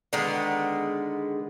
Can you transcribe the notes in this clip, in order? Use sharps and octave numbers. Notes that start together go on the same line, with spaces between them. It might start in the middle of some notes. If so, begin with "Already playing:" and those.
D3 D#3 G#3 B3